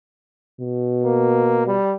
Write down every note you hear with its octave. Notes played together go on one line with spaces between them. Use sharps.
B2
A#3
G3